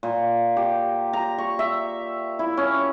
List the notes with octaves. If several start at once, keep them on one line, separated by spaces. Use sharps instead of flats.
A#2
G4
A#5
C#6
E5
E4
C#4